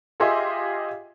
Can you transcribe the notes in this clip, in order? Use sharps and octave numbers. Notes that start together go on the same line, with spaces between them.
F4 G4 G#4 D#5 E5 C6